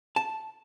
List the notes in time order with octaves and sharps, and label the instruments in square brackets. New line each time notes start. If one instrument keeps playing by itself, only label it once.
[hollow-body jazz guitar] A5